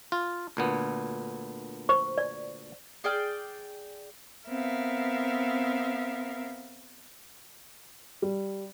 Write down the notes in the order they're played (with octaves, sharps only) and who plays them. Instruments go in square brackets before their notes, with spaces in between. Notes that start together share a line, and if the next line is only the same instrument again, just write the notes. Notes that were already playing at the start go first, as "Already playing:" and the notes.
[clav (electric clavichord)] F4
D2 A#2 B3
[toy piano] C5 C#6
D5
[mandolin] G#4 D5 G5 F6
[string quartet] B3 C4 A#4 E5 F5
[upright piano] G3